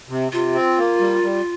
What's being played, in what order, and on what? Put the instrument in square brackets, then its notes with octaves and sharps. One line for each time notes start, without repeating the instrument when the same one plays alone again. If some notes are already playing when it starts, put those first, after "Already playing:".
[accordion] C3
[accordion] C3 [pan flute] F4
[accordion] C4
A#3
G3
G3